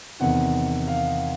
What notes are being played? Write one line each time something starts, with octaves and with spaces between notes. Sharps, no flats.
E2 C3 D#3 F#5
F5